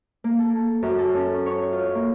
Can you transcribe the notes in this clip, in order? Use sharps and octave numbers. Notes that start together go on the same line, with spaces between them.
A#3
A4
F#2
A4
C#4
C#5
F4
A#3